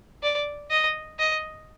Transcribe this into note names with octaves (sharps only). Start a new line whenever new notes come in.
D5
D#5
D#5